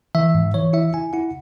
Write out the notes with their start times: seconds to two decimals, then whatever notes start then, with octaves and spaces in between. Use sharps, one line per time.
0.15 E3 E5
0.35 G#2
0.54 E3 C#5
0.73 E4 E5
0.93 E4 G#5
1.13 E4 F#5